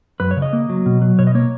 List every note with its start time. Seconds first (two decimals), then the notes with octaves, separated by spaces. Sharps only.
0.20 F#2 B4
0.31 C#5
0.37 C#3
0.42 D#5
0.53 A#3
0.69 F#3
0.86 B2
1.02 F#3
1.19 B2 C#5
1.27 D#5
1.35 A#3 C#5